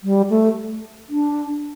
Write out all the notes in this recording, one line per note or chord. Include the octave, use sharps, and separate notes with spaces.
G3
A3
D4